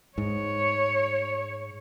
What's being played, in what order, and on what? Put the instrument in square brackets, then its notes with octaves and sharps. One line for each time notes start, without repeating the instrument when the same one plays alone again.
[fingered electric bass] G#2 [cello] C#5